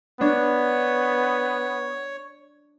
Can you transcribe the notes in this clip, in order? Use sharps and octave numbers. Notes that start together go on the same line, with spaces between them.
B3 D4 C#5